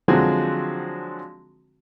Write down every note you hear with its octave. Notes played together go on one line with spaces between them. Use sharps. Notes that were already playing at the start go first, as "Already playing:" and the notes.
D3 F3 F#3 G#3 C4 F#4